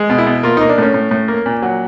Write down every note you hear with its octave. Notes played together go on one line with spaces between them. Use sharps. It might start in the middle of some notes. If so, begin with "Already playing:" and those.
Already playing: G#3
B2
E4
B2
A#3 F4
A#3 D#4
D4
A2 C#4
A2
A2
A#3
A#2
F#3